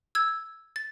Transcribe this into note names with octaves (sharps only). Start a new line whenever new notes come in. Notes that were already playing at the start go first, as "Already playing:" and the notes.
E6 G#6
A6